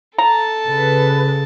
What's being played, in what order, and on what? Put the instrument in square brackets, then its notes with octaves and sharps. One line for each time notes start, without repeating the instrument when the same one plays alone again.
[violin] A4 A5 [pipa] A#5
[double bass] C#3 [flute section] B4